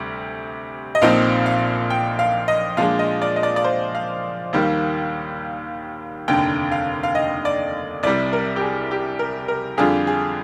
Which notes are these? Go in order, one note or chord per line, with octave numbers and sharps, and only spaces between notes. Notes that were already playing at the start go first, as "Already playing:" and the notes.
Already playing: D2 C3 G3
D#5
A#1 A#2 F3 C4 D#4 F5
F5
G5
F5
D#5
A#2 F3 G#3 D4 F5
D#5
D5
D#5
D5
D5
C5
F5
D#2 D#3 G3 A#3
F1 D#2 D3 G5
F5
F5
D#5
D5
C2 C3 G3 D5
A#4
G4
G#4
G4
A#4
A#4
F2 D3 G3 D4 F4 G#4
G#4